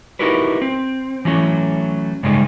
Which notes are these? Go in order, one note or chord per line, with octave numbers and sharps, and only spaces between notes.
D#4 E4 F#4 G4 A#4 B4
C4
E3 F#3 A3 C#4
G2 C#3 G#3 A3 D#4